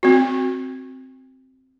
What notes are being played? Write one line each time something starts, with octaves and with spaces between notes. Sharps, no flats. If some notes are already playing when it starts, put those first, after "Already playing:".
C4 F#4